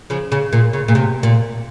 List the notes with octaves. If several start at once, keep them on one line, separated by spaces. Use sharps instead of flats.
C#3 F3
C#3
A#2
C#3
A#2
C3
A#2